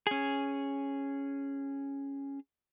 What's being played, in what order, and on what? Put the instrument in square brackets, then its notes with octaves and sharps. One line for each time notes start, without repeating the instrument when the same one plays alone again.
[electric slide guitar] C#4 G#4